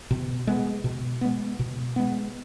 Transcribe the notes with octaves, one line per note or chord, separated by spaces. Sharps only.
B2
G#3 B3
B2
G#3 B3
B2
G#3 B3